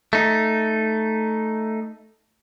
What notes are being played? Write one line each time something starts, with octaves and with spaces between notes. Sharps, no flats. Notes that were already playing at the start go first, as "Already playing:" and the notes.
A3 D#4